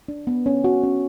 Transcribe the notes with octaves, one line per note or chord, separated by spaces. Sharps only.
D4
B3
C#4
F#4
C#4